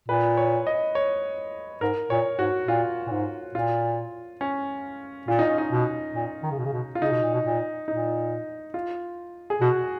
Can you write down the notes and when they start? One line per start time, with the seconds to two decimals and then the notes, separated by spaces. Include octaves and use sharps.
0.08 A#2 B4
0.37 C#5
0.67 D#5
0.95 C#5
1.81 G#2 A#4
2.10 A#2 C#5
2.39 G#2 F#4
2.68 A#2 F4
3.07 A#2
3.11 G#2
3.55 A#2 F4
4.41 C#4
5.28 A#2 F4
5.39 D#4
5.49 C#4
5.58 D#4
5.71 B2
6.15 A#2
6.43 D#3
6.51 C#3
6.58 B2
6.65 C#3
6.73 B2
6.95 F4
7.02 C#3 D#4
7.12 B2
7.22 A#2
7.34 B2
7.45 A#2
7.88 A#2 D#4
8.74 F4
9.50 G#4
9.61 B2 F#4